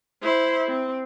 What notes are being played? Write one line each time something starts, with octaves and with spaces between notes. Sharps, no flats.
E4 C5
C4